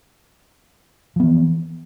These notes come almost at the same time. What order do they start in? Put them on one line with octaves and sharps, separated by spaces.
F3 B3 E3